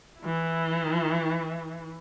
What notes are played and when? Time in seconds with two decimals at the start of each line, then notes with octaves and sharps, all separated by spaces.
0.20 E3 E4